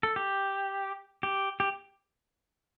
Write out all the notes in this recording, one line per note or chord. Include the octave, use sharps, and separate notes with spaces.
A4
G4
G4
G4